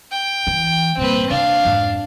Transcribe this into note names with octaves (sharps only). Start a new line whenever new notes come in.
G5
E3
G2 A#2 C4 B4
C3 D4 F5
F2 G#2